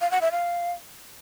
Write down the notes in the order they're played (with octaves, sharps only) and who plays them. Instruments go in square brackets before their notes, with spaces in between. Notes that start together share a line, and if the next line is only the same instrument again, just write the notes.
[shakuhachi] F5
F#5
E5
F5